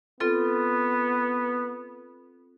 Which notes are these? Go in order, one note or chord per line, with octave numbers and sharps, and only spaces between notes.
B3 C4 F4 A4